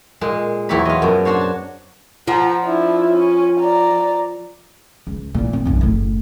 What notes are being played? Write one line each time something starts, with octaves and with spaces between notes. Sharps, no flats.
A#2 G#3
E2 F#3 E4 G4 C#5 B5
F4 D#5
F#2 B2
D4 F#4 C5 C#5
A5
F3 F#5 A#5
D4 E4
C#4
D5 A#5
C#2
A#2 E3
C4
B1 F#2
F#1 A2